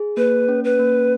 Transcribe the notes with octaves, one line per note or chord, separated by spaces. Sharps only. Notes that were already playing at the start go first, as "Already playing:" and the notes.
Already playing: G#4
A#3 B4
C#4
B4
A#3